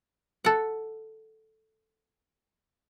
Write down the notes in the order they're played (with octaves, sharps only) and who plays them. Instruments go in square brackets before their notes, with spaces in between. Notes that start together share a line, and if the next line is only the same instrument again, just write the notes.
[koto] A4 F#5